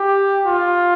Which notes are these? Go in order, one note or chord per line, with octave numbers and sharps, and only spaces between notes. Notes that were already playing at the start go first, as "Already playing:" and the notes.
Already playing: G4
F4